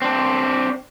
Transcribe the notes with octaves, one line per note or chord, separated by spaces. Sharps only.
C4 D4